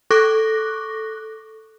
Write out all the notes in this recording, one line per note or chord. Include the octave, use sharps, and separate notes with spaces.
A4 C#6 D6 F#6 A#6